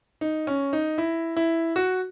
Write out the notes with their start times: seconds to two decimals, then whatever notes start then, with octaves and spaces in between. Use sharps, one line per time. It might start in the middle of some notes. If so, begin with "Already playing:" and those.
0.21 D#4
0.47 C#4
0.73 D#4
0.98 E4
1.36 E4
1.76 F#4